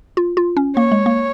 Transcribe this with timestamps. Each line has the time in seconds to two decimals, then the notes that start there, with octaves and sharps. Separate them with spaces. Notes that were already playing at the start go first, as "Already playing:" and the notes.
0.17 F4
0.37 F4
0.57 C#4
0.76 A#3 C#5
0.92 G#3
1.06 A#3